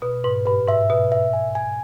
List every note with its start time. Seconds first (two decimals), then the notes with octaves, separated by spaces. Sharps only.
0.02 B2 B4
0.24 G#2 B4
0.46 G2 B4
0.68 G#2 E5
0.90 B2 B4
1.12 E5
1.33 G#5
1.55 G#5